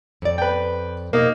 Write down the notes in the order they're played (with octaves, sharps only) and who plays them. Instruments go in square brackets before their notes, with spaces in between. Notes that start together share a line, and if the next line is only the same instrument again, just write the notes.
[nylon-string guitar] F2 D5
[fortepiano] B4 G5
[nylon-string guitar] B2 [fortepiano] A#3 D#4